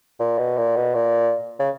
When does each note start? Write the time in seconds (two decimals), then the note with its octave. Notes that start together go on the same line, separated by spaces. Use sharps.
0.20 A#2
0.38 B2
0.57 A#2
0.76 B2
0.95 A#2
1.60 C#3